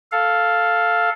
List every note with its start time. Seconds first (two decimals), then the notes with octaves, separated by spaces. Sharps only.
0.12 A4 F5